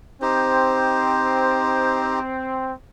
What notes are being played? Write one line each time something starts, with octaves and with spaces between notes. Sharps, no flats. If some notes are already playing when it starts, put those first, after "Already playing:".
C4 D#4 G4 C5